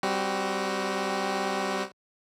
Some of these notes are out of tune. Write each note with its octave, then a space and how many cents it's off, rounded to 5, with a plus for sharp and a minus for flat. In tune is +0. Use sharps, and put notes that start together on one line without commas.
G3 +0 C4 +0 F#4 +20